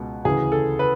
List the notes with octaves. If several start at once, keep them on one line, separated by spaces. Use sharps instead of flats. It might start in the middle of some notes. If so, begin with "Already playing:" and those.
Already playing: C#2 B2
D2 C#3 E3 G#4
A4
B4